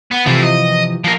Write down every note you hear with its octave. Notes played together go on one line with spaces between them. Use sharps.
B3
C3 E3 F3 A3 E4
D#5
F3 A#4